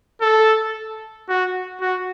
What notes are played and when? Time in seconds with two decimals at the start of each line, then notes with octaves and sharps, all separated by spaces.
0.21 A4
1.29 F#4
1.81 F#4